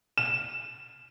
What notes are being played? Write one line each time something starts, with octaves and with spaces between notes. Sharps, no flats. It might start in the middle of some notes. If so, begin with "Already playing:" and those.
E7